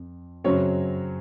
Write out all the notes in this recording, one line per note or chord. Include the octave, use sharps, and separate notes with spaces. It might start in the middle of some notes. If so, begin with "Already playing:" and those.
Already playing: F2
F#2 C#3 F#3 C4 C#5